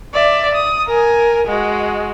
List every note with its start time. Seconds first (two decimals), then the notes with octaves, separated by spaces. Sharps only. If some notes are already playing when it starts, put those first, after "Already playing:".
0.14 D5 E5
0.55 D#6
0.87 A#4 G#5
1.47 G#3 F#4